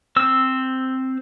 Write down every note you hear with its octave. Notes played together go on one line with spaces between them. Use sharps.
C4 E6